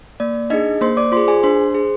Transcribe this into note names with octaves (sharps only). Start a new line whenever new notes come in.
A#3 D5
D4 D#4 G#4 D#5
A#3 C5 C6
D5 D6
F4 G#4 C5 C6
G#4 G#5
D4 C5 C6
G#4